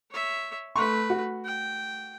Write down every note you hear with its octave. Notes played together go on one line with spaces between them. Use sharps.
C#5 E5
A3 B4 C6 C#6
F#4
G5